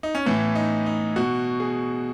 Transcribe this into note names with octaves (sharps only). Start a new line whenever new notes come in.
D#4
C#4
A2 E3 B3
D#4
D#4
B2 F#4
G#4